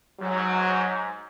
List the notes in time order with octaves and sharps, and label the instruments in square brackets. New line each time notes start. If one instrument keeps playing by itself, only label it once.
[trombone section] G#2 [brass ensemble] F#3